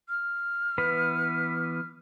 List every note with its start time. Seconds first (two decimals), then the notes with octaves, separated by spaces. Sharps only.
0.09 F6
0.78 E3 B3 B4